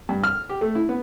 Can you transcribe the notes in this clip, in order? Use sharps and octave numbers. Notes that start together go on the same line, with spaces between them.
G2
F6
G4
A3
E4
B3